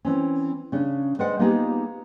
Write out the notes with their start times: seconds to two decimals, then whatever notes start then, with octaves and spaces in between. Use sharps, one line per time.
0.05 E3 C4 C#4
0.72 C#3 C#4 D4
1.19 G#3 B4 C5 D5 F#5
1.39 A#3 B3 D#4 F4 G4 G#4